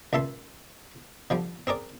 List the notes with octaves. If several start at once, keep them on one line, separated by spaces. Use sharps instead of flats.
C#2 A#2 E5 A5 C6
D3 F3 G3
C4 G#4 A#4 D5